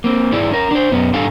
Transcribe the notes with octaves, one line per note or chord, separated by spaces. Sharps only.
A#3 C4
G#2 E4 G#4 D5
C#4 A#4
D4 C5
F#2 B3 C#4
G#2 G3 D4 A4 F5 G#5